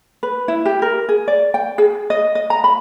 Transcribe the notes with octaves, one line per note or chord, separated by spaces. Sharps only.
B4
E4
G4
A#4
G#4
D5
G5
G#4
D#5
D#5
A#5
B5